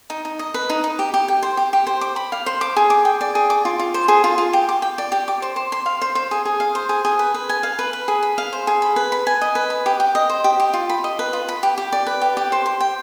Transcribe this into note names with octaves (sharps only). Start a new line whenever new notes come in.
D#4
D#4
D#5
B4
D#4
D#4
G4
G4
G5
C5
G4
G4
C5
D6
B5
F5
C5
D6
G#4
D6
G5
D5
G#4
D6
F4
F4
C5
G#4
F4
F4
G4
D6
G5
D5
G4
D6
C5
C5
C6
F5
C5
C5
G#4
G#4
F5
C5
G#4
G#4
B4
B4
G#5
F5
B4
B4
G#4
B5
F5
C5
G#4
B5
B4
B5
G#5
D#5
B4
B5
G4
G4
D#5
C5
G4
G4
F4
B5
D#5
B4
F4
B5
G4
G4
D5
B4
G4
G4
C5
C6
G5